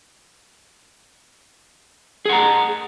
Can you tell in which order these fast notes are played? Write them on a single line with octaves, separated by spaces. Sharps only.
G#4 F#5 A#5